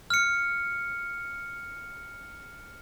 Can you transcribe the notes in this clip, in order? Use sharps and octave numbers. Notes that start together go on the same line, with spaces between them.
F6 C#7